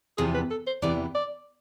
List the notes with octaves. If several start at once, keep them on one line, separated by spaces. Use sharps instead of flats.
E2 C3 F3 B3 G#4
B4
A4
C5
E2 C3 E3 B3 D5
D5